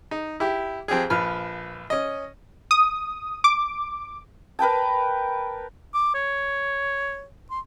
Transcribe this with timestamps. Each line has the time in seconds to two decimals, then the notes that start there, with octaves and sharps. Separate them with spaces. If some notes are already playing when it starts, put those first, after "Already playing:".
0.11 D#4
0.40 E4 G4
0.88 F2 C4 G4 G#4
1.10 A#1 F3 B4 F6
1.90 C#4 D#5
2.71 D#6
3.44 D6
4.59 A#4 B4 G5 A5
5.94 D6
6.15 C#5
7.51 C6